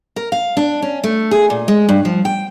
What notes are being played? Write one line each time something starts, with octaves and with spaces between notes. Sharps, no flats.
A#4
F5
D4
C#4
A3
G#4
A#2
G#3
G2
F3
G5